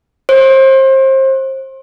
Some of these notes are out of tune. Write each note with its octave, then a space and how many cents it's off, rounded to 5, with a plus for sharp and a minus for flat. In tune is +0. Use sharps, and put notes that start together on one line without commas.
C5 +30